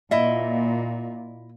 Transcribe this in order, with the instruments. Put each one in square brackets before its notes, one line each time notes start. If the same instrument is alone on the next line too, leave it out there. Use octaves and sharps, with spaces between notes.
[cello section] A#2 [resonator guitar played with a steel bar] E4 D#5 E5